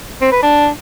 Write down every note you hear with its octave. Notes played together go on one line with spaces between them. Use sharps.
C4
B4
D4